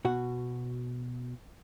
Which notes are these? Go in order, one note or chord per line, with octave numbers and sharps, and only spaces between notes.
B2 F#4 F#5